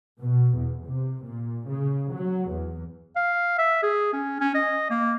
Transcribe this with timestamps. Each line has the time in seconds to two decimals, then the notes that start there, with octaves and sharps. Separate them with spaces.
0.20 B2
0.56 E2
0.85 C3
1.24 A#2
1.69 C#3
2.14 F#3
2.50 E2
3.16 F5
3.58 E5
3.83 G#4
4.13 C#4
4.40 C#4
4.55 D#5
4.90 A#3